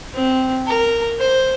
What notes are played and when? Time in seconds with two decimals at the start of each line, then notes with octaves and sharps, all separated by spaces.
0.14 C4
0.67 A#4
1.19 C5